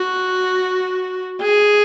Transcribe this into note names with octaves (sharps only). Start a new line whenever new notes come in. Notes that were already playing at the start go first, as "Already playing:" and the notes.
Already playing: F#4
G#4